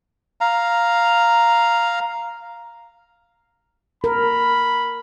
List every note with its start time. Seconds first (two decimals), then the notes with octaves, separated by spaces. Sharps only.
0.41 F5 A#5
4.04 A#4 B5